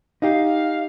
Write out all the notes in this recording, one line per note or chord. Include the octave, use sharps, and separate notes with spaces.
D#4 G4 F5